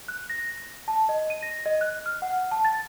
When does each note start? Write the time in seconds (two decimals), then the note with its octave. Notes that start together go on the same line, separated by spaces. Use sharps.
0.08 F#6
0.30 A#6
0.88 A5
1.09 D#5
1.30 D#7
1.43 A#6
1.66 D#5
1.81 F#6
2.06 F6
2.22 F#5
2.51 A5
2.65 A6